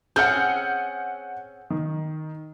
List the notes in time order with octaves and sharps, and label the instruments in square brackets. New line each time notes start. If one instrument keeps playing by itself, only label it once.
[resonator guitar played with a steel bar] C4 C#4 G#4 [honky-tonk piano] F#5 F6 [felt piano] G6
[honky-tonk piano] D#3